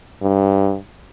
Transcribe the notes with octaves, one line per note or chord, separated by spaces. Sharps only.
G2